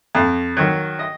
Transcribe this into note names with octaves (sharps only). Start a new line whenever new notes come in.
F2
D#3 F#3
D#5